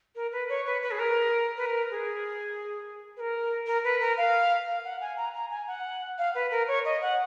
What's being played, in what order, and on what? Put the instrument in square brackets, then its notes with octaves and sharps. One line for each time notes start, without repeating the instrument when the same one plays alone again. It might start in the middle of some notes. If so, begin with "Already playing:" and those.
[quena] A#4
B4
C#5
B4
B4
G#4
A#4
B4
A#4
G#4
B4
A#4
A#4
B4
A#4
F5
F5
F#5
G#5
A#5
A#5
G#5
F#5
F5
B4
A#4
C#5
D#5
F#5